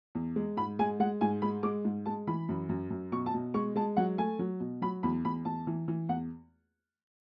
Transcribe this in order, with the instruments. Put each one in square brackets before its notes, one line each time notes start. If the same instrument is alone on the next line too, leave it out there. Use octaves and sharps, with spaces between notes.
[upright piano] E2
G#3
G#2 B5
G#3 G#5
G#3 F#5
G#2 G#5
G#3 B5
G#3 D6
G#2
G#3 A5
E3 B5
F#2
F#2
F#2
B2 C#6
A5
B2
G#3 C#6
G#3 A5
F#3 F#5
A3 G#5
F#3
B2
F#3 B5
E2 B5
E2 B5
E2 A5
E3
E3
E2 F#5